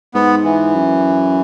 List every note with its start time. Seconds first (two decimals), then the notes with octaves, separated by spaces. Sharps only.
0.14 G#2 B3
0.44 E3
0.75 F#2